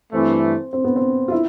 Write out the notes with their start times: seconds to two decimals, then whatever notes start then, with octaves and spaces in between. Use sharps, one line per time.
0.12 G2 E3 A3 C4
0.73 C4
0.84 B3
0.96 C4
1.28 F4
1.31 E4